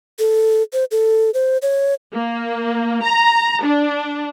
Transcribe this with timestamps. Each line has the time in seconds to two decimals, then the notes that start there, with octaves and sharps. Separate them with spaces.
0.19 A4
0.73 C5
0.91 A4
1.34 C5
1.62 C#5
2.14 A#3
3.04 A#5
3.64 D4